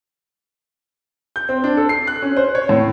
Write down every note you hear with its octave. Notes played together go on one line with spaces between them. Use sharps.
G6
C4
D4
A4
C7
F#6
C#4
C5
C#5
A2